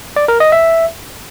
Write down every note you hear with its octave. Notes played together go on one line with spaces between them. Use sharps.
D5
A#4
D#5
E5